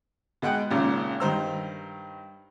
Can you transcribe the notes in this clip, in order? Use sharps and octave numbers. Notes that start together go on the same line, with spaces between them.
B2 G#3 F#5 G5 F#6
G#1 A#2 C#3
G2 D#3 C5 A#5 E6